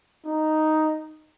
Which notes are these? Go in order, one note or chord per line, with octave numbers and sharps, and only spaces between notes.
D#4